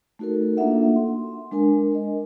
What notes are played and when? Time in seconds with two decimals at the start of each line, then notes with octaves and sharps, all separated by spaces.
0.19 A3 D#4 F#4 A4 A#4
0.57 A#3 D4 F4 A4 E5 F#5
0.96 C6
1.51 G#3 D4 A#4 G#5
1.92 A#4 D#5